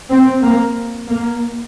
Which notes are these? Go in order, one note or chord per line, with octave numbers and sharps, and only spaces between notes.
C4
A#3
A#3